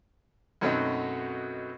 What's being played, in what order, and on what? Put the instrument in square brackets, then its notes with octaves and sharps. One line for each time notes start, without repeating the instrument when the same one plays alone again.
[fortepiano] F#2 B2 F#3 A3 C4 D#4